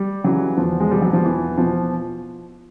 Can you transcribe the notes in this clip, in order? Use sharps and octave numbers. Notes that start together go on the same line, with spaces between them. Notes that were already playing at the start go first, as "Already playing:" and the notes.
Already playing: G3
C#3 E3 F#3
E2 F3
G#3
B2 G3
F#3
F3
E2 E3
B2 F3